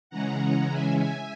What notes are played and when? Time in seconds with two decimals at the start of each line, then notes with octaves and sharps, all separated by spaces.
0.10 C#3 E3 G#3 C#4 F#5 A#5
0.69 E5 G#5
0.97 E5 G#5